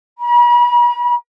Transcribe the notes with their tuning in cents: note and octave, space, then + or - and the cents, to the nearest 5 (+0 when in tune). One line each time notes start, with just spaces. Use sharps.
B5 -45